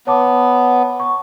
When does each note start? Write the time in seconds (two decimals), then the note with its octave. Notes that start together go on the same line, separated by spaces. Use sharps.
0.07 B3 C#5 A5 D6
1.00 C#6